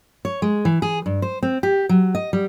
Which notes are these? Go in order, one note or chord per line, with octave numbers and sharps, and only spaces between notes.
C#5
G#3
E3
G#4
G2
C5
C4
G4
F#3
D#5
G3